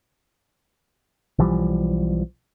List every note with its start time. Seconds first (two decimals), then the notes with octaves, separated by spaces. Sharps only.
1.39 B1 E3 F3 G3